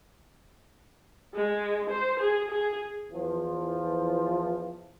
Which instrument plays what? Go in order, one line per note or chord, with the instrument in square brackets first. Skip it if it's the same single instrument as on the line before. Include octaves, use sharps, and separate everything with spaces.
[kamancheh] G#3
C5
G#4
G#4
[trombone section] E2 E3 F3